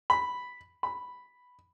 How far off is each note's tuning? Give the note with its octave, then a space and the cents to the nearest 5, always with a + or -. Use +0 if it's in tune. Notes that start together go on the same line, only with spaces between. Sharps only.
B5 +0
B5 +0